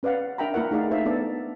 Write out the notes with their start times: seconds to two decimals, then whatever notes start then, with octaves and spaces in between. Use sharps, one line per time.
0.03 C#4 B4 D5 F5 F#5
0.38 D4 A#4 E5 G5 A#5 B5
0.54 A#3 E4 A#4 F#5
0.71 A3 D#4 G#4 D5 F5
0.91 D#4 A4 C5 E5 F5
1.05 B3 D4 A4 D5